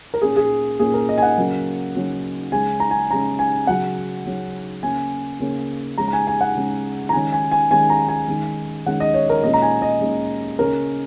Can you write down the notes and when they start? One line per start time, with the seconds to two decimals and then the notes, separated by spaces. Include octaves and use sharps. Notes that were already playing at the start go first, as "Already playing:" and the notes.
0.14 A#4
0.22 A#2 A#3 C#4 G#4
0.37 G#4
0.79 A#2 A#3 C#4 G#4
0.94 A#4
1.09 D#5
1.18 G#5
1.22 F#5
1.37 C#3 F#3 A#3 C#4
1.95 C#3 F#3 A#3 C#4
2.52 C#3 G#3 C#4 G#5
2.80 A#5
2.91 G#5
3.11 C#3 G#3 C#4 A#5
3.39 G#5
3.67 C#3 F#3 C#4 F#5
4.25 C#3 F#3 C#4
4.83 C#3 A#3 C#4 G#5
5.40 C#3 A#3 C#4
5.98 C#3 G#3 C#4 A#5
6.08 A#5
6.13 G#5
6.27 G#5
6.41 F#5
6.55 C#3 G#3 C#4
7.09 A#5
7.13 D#3 G#3 C#4 G#5
7.32 G#5
7.52 G#5
7.70 D#3 G#3 C#4 G#5
7.90 A#5
8.09 G#5
8.28 D#3 G#3 C#4
8.86 D#3 G#3 C#4 F#5
9.00 D#5
9.14 C#5
9.30 A#4
9.43 A#2 G#3 C#4 D#5
9.54 A#5
9.62 G#5
9.82 D#5
10.01 A#2 G#3 C#4
10.59 C#3 A#3 C#4 A#4